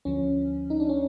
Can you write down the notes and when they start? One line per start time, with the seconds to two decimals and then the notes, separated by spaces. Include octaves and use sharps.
0.05 D2 D3 F3 C#4
0.70 D#4
0.80 D4
0.89 C#4